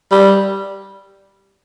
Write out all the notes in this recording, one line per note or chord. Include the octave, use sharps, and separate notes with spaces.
G3